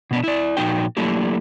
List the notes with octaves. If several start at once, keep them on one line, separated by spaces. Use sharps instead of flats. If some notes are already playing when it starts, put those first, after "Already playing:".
B2 B3 D4
E4 D5
A#2 F3 D#4 F#4 G5
F#3 A3 A#3 D4 E4 G4